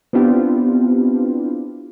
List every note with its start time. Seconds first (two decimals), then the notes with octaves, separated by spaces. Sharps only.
0.13 B3 C4 D4 E4 F4 G4